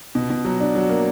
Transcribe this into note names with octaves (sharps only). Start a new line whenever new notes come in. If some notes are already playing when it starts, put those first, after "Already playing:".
B2
B2
F#3
D4
F#3
A#3